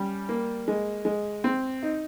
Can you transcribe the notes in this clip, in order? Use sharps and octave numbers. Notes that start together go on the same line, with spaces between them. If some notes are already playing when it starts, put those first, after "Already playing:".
Already playing: G3 C#4
A#3
G#3
G#3
C4
D#4